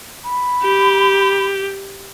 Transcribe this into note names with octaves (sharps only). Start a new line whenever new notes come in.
B5
G4